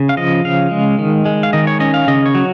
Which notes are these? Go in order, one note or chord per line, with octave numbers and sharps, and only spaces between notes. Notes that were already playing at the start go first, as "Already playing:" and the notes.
Already playing: C#3
F5
F3 D#5
C#3 F5
G#3
D#3
G#3
F5
D#3 D#5
C#5
C#4 D#5
F5
C#3 D#5
C#5
F#3